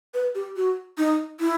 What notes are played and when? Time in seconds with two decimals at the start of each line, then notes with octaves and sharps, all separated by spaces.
0.14 B4
0.35 G4
0.56 F#4
0.98 D#4
1.40 E4